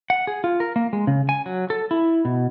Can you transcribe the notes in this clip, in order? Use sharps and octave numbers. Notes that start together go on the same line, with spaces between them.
F#5
G#4
F4
A#4
A#3
G#3
C#3
G#5
F#3
A4
E4
B2